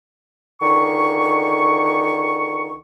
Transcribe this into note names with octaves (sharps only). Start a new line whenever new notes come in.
C#2 D3 D#3 C#6